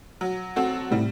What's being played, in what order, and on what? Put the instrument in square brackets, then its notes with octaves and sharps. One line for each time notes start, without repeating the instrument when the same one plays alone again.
[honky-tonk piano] F#3
C4 F#4 A4
[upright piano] A2 C3 [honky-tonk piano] G3